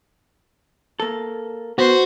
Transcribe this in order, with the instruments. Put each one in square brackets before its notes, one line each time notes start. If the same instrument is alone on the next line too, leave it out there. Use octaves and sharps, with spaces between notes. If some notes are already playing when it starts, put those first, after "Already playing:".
[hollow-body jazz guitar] A#3 A4
[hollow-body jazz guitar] B3 [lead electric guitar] F#4 [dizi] C5